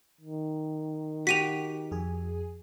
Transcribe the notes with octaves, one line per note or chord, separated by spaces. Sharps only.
D#3
F#4 G4 B6 D#7 F7
F2 G#4 G#5